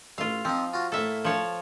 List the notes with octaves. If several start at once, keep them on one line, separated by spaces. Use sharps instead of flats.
A1 F4 F5
F3 C4 D#4
F4 F#4 A5
A2 A#3 A4 E5
F3 C#5 A5